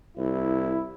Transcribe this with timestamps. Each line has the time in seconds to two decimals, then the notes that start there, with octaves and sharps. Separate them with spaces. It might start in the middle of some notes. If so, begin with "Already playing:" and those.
0.17 C2 E4